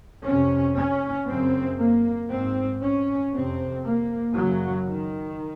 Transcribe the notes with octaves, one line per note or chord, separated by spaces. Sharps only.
F2 C3 C#4
C#4
F#2 C#3 C4
A#3
G#2 C4
C#4
F2 C3 C4
A#3
F#2 C#3 F#3
D#3